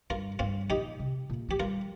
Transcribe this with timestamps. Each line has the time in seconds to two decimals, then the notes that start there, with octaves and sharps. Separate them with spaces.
0.10 G2 F4 A#4
0.39 G2 C4 F4
0.70 A#2 D#4 G4
1.00 C3
1.30 A#2
1.49 F3 G4
1.59 G3 F4 A#4